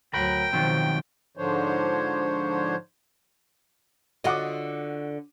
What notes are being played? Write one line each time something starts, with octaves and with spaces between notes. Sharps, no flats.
D2 F#3 A#4 G5 B5
B2 D#3 F3 F#3 C4
G#2 D3 F3 D4 C5 C#5
D3 F4 F#4 D#5 F#5 D6